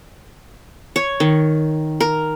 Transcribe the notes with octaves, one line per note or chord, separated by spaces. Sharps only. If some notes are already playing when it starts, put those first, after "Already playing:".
C#5
D#3
A#4